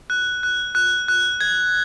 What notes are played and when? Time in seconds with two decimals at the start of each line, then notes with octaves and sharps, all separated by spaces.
0.10 F#6
0.43 F#6
0.75 F#6
1.08 F#6
1.41 G#6